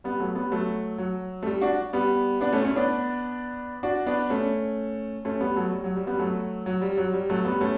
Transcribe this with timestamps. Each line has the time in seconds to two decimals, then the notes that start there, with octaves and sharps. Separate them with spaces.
0.04 G3 B3
0.20 F#3 A3
0.35 G3 B3
0.51 F#3 A3
0.98 F#3
1.43 A3
1.46 G3
1.62 D4 F#4
1.93 G3 B3
2.41 B3 D4
2.53 A3 C#4
2.64 A3 C#4
2.76 B3 D4
3.83 D4 F#4
4.06 B3 D4
4.30 A3 C#4
5.25 A3 C#4
5.40 G3 B3
5.56 F#3 A3
5.72 G3
5.84 F#3
5.96 G3
6.07 G3 B3
6.19 F#3 A3
6.66 F#3
6.82 G3
6.98 F#3
7.14 G3
7.30 F#3 A3
7.45 G3 B3
7.61 A3 C#4